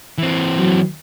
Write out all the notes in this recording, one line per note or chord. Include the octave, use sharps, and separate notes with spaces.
E3 C4
F#3